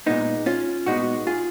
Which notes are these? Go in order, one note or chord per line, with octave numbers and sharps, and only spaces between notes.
A#2 G#3 B3 D#4
C#4 F4
A#2 G#3 B3 D#4 F#4
F4 G#4